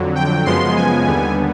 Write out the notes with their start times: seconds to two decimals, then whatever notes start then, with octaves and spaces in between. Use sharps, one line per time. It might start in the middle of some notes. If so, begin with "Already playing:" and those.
Already playing: F2 D3 F#3
0.15 G5
0.45 F#2 C#3 F3 G#3 B3 C6
0.77 G#5
1.07 D#2 D3 G3 B3